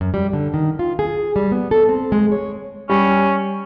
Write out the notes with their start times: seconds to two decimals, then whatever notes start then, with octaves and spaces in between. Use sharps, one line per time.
0.01 F#2
0.14 G3
0.33 D3
0.54 D#3
0.79 F4
0.99 G#4
1.36 G3
1.52 B3
1.71 A4
1.89 C4
2.12 G#3
2.32 C#5
2.89 G3 C#4